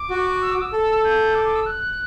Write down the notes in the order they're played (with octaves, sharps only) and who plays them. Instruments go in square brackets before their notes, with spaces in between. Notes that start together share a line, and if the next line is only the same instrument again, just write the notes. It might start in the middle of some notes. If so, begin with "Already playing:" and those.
Already playing: [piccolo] D6
[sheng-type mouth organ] F#4
[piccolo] E6
D6
E6
[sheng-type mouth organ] A4
[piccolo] G6
D6
D6
E6
F#6